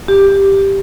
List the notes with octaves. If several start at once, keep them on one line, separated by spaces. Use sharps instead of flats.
G4